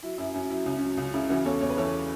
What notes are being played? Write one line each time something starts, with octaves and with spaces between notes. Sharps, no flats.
F#3 E4
F#2 E4
F#2 C#4
F#3 E4
C#2 C#4
C#4
F#3
C#2 C#4
C#3 E4
E3 C#4 F#4
E2 A4 C#5
E2 C#5
B4
E3 A4 C#5